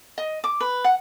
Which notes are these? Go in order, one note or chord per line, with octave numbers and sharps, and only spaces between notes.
D#5
D6
B4
F#5